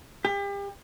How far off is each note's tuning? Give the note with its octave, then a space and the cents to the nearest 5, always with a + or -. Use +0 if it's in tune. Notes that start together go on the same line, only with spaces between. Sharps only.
G4 +35